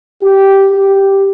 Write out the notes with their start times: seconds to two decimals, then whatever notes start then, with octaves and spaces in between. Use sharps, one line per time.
0.22 G4
0.73 G4